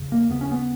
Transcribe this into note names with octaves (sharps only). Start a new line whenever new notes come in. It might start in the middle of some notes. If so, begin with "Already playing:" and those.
Already playing: E2 C#3
A#3
D#2 C#3 B3
C#4
B3